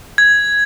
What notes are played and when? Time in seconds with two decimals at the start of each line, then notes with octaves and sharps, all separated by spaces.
0.18 G#6